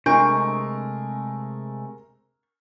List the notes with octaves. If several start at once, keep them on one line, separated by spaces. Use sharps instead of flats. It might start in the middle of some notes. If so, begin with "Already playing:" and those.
C3 G#3 A3 D4 A#4 A#5 C#6 D7